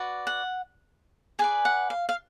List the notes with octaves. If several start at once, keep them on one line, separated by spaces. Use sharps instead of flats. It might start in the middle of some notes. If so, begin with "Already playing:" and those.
Already playing: F#4 B4 D5
F#5
G#4 B4 D5 G#5
F#5
F5
F5